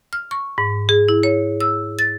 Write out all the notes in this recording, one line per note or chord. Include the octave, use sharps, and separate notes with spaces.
F6
C#6
G#2
G#4
E4
C#5
E6
A6